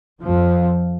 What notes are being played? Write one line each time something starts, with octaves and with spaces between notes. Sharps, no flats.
F2 F3